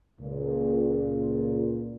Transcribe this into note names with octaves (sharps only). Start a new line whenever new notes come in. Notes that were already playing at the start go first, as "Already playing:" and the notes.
C#2 A#2